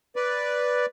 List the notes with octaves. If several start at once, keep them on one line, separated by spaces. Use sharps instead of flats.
B4 D5